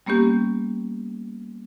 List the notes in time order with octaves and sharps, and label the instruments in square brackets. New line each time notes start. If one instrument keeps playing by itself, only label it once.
[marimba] G3 A#3 B3 C#4 G4